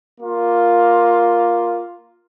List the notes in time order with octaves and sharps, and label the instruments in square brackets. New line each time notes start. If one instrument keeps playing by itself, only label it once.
[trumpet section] A#3 F4